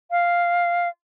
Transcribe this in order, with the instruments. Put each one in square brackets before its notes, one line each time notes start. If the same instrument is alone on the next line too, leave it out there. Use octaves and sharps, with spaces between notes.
[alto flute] F5